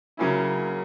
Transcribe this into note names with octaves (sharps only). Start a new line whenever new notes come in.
C#3 F#3 A#3 C#4 E4